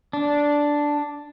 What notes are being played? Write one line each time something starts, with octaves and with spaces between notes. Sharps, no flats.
D4